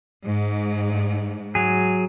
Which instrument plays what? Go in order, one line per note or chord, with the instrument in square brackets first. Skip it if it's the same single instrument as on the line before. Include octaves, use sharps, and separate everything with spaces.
[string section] G#2
[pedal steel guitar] F#3 G#4